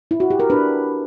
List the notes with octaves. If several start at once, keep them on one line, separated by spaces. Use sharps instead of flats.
E4
F#4
G4
A#4
D4 B4